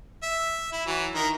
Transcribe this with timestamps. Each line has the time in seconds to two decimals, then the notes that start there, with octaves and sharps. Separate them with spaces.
0.23 E5
0.72 E4
0.87 E3 F#3
1.15 D#3 A#4